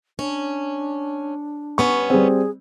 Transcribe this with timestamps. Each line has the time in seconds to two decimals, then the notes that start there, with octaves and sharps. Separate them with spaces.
0.19 C#4 D4
1.78 G2 B3 C#4 C#6
2.10 G3 C4 G#4